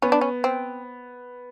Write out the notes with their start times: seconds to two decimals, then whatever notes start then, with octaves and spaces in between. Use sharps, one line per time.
0.02 B3 C#4
0.12 D4
0.21 C#4
0.44 C4